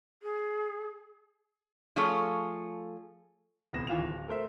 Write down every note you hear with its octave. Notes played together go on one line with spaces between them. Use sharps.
G#4
F3 A3 F4 G#4 A4 C#5
D#1 C2 B3 A#6 E7
D#2 E3 F4 E7 F7
D1
A3 A#4 C5 E5